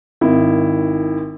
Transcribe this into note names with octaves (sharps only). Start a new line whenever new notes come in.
G#1 D#3 E4